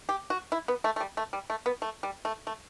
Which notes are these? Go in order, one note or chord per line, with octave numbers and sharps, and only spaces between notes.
G4
F#4
E4
B3
A3
A3
G3
A3
G3
A3
B3
A3
G3
A3
A3